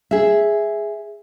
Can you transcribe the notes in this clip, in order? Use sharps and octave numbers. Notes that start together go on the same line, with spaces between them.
G#4 E5